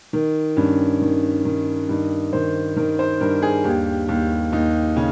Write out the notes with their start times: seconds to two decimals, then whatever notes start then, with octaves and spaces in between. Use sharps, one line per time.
0.13 D#3
0.57 G2 C#4
1.02 D#3
1.45 D#3
1.89 G2 D#4
2.33 D#3 C5
2.76 D#3 A#4
2.99 C5
3.21 G2 A#4
3.42 G#4
3.64 D#2 G4
4.09 D#2
4.52 D#2 D#4
4.96 C#3 C#4